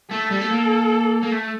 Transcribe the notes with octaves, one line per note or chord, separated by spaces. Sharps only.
A3 A4
G3
A3
A#3
A#3
A3